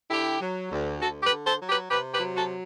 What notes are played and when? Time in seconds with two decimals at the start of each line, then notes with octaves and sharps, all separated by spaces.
0.10 D3 E4 G4
0.41 F#3
0.71 D2
1.00 D2 F#4 A4
1.23 G4 B4
1.31 D3
1.45 A4 C5
1.60 F#3
1.68 G4 B4
1.90 C3 G4 B4
2.13 G4 B4
2.20 F#3
2.35 F#4 A4